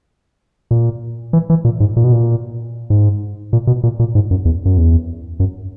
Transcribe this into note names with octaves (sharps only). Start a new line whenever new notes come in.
A#2
E3
E3
A#2
G#2
A#2
B2
A#2
G#2
A#2
B2
A#2
A#2
G#2
F#2
E2
F#2
E2
F#2